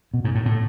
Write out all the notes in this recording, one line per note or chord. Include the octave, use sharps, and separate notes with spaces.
B2
G#2
A2
A2